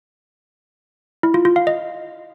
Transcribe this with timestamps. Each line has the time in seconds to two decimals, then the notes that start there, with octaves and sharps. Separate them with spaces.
1.23 E4
1.34 F4
1.45 F4
1.56 F5
1.67 D#5